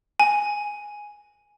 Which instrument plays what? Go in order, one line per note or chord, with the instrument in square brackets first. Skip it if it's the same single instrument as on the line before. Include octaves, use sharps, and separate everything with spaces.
[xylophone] G#5